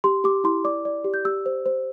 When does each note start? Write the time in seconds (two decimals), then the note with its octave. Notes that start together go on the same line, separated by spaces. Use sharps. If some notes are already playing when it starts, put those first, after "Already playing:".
0.04 G4 C6
0.24 G4 D6
0.44 E4 C6
0.64 D5 D6
0.85 D5
1.04 G4
1.14 G6
1.25 G4 E6
1.46 C5
1.66 C5